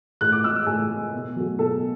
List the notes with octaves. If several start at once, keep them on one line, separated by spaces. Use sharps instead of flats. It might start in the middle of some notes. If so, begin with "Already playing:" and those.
A2 F#6
D6
G#3 E6
A2 G#5
G#3
B2
F#3 A3
B2 A4